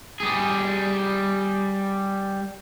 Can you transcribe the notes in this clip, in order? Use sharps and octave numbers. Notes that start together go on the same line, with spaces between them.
G3 G#4